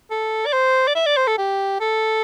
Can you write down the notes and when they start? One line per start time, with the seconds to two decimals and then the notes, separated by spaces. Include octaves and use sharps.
0.11 A4
0.46 D5
0.53 C5
0.87 D5
0.95 E5
1.06 D5
1.17 C5
1.27 A4
1.38 G4
1.80 A4